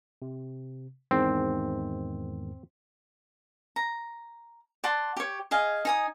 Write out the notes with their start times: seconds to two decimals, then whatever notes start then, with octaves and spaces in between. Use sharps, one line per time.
0.22 C3
1.11 E2 G#2 D#3 C4
3.76 A#5
4.84 D5 F#5 A5 C6
5.17 G4 C#5
5.51 G#4 D#5 F5 G#5
5.85 D#4 G#5 D#6